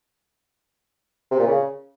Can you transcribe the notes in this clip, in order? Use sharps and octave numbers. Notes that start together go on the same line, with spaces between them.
C3
A#2
C#3